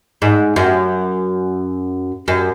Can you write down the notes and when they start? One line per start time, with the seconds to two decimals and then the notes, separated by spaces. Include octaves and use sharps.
0.22 G#2
0.56 F#2
2.28 F#2